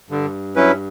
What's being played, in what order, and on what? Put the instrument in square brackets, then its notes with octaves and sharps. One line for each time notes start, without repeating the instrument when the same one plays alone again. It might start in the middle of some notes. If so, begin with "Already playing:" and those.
[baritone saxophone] G2 [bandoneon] D3
[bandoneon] F#3 C#4 E4 B4